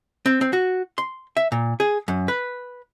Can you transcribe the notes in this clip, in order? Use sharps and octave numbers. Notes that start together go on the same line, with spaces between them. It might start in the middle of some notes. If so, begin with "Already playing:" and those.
C4
C4
F#4
C6
E5
A#2
G#4
F#2
B4